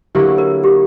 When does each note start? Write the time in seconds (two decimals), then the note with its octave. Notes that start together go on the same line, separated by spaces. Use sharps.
0.15 D3 F#3 A#3 E4 G4
0.38 A#4
0.64 G4